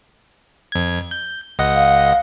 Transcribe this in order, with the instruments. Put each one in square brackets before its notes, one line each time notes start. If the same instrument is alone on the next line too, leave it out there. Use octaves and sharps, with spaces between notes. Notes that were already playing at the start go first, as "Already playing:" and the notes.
[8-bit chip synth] F2 G#6
G6
C#2 D#5 F#5
[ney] F5